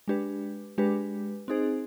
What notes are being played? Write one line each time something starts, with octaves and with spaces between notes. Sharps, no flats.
G#3 D4 G4 B4
G#3 D4 G4 B4
C4 D#4 G#4 C5